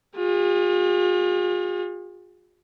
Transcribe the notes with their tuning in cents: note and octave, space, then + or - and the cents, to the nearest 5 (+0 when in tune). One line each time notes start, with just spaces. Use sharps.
F4 +40 G#4 -40